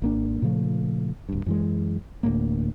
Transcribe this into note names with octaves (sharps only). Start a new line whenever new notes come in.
G#1 A#3 D4
A#2 C#3 F3 A3
D1 G2
F#2 E3 G#3
D1 D2 A2 A#3